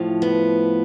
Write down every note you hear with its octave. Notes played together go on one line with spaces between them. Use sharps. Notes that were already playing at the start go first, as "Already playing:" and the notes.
Already playing: A2 F3
B3